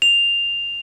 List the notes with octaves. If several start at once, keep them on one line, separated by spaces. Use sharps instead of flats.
F7